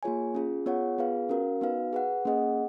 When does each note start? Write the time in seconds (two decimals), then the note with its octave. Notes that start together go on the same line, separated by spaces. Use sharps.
0.03 A#3 F4 G#4 C#5 G#5
0.35 C#4 F4 G#4
0.66 B3 F4 G#4 C#5 F#5
0.98 B3 F4 G#4 B4 F5
1.29 C#4 F#4 A#4 F5
1.61 B3 D#4 F#4 B4 F5
1.93 G#4 B4 F#5
2.25 A#3 C#4 G#4 D#5 F#5